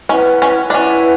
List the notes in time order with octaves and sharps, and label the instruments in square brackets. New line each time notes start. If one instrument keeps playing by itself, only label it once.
[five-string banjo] C#4 [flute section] E4 B4 F#5
[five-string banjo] C#4
D4
[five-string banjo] C#4 [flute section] E4 B4 F#5